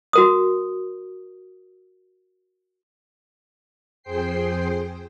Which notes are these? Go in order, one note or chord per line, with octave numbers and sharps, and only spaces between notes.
F#4 A#4 D#6
F2 G#4 C5 G5 C7